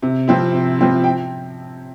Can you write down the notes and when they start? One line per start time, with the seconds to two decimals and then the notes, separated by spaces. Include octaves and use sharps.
0.02 C3
0.28 F3 C4 E4
0.54 C3
0.79 F3 C4 E4
1.04 G5